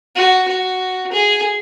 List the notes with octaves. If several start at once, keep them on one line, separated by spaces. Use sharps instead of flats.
F#4
F#4
G#4